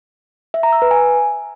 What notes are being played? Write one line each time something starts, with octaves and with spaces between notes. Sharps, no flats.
E5
A#5
E6
B4
G#5